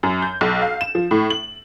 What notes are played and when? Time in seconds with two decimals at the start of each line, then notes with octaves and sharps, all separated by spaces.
0.03 F#2
0.22 G6
0.41 B1
0.62 F5
0.81 E7
0.95 F3
1.11 A2
1.30 F#7